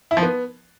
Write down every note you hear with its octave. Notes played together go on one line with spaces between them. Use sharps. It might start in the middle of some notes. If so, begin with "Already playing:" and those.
E4
F3
B3